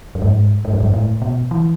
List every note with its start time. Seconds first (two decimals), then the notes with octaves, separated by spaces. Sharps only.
0.15 F#2
0.22 G#2
0.65 G#2
0.73 F#2
0.80 G#2
0.94 A2
1.22 B2
1.51 E3